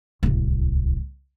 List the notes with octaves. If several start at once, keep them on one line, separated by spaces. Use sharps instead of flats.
D1 C2